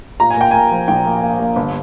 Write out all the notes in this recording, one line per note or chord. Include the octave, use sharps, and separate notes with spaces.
A#2 A#5
G#5
A#3 G5
A#3 G#5
F3
A#1 G5
A#3
A#3
A#3
G1